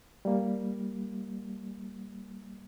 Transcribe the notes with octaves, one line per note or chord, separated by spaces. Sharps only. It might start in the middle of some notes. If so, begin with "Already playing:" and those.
G3 A#3